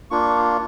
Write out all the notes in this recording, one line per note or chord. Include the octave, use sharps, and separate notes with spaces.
A#3 D4 F4 C#6